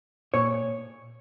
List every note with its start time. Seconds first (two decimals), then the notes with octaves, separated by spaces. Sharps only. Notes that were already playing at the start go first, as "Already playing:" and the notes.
0.34 A#2 C#5